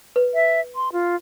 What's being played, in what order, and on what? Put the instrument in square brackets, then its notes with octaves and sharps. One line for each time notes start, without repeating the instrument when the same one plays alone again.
[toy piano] B4
[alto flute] E5
C6
F4